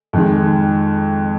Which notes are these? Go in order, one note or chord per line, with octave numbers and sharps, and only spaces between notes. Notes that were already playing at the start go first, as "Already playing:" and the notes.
F2 D#3 G#3